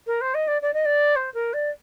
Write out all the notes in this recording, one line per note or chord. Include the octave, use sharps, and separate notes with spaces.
A#4
C5
D#5
D5
D5
D#5
D5
C5
A#4
D5